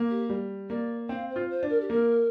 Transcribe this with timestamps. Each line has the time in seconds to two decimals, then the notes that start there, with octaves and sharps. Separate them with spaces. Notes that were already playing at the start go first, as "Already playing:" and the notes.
Already playing: A#3
0.10 G4
0.29 G3
0.69 A#3 D5
1.09 C4 F5
1.30 C5
1.36 F4
1.50 C5
1.63 D4
1.69 A#4
1.80 G4
1.90 A#3 A#4